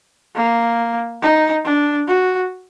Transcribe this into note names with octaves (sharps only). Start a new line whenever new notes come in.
A#3
D#4
D4
F#4